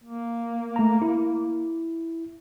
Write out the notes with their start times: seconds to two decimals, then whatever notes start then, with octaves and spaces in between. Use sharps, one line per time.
0.04 A#3
0.76 A3 A#5
1.02 E4